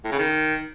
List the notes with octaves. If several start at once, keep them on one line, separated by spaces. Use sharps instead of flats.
A2
C#3
D#3